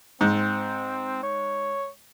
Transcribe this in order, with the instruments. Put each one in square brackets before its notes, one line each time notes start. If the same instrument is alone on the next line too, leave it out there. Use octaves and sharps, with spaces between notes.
[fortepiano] G#2 [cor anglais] C4
[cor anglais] C#5